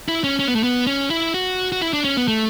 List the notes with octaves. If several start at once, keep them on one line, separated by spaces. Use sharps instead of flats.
E4
C#4
C#4
B3
A3
B3
C#4
E4
F#4
F#4
E4
D4
C#4
B3
A3